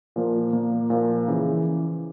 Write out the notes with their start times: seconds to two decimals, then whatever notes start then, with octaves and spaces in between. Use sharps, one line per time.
0.16 A#2 F3 A#3
0.53 A#2 F3 A#3
0.90 A#2 F3 A#3
1.28 C#3 E3